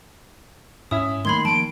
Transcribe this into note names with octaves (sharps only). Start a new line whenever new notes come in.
G#2 C#4 E4 E5 D#6
D#3 G3 A3 A#3 B5 C6 G#6 G7
F3 A#3 A5 D7